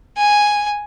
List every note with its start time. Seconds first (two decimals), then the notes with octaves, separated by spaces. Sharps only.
0.17 G#5